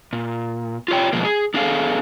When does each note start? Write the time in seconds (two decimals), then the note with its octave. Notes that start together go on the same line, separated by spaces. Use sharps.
0.13 A#2
0.88 F4 G4 C#5 G5
1.13 B2 F3 G#3 A#3
1.25 G#4
1.54 B3 D4 G#4 A4 F5